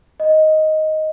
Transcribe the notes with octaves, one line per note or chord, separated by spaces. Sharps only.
D#5